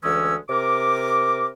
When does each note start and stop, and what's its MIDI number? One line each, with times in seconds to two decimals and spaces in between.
0.03 0.35 38
0.03 0.35 52
0.03 0.35 56
0.03 0.35 61
0.03 0.35 88
0.49 1.46 48
0.49 1.46 70
0.49 1.46 86